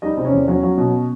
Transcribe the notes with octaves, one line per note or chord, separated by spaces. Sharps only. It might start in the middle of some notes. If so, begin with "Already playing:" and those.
G3 D#4 D#5
C3
C#4 C#5
E2 D5
F#3 C#4 C#5
F#3
B2